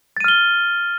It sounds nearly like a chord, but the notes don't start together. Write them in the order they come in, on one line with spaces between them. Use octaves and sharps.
A6 D#7 F6 G7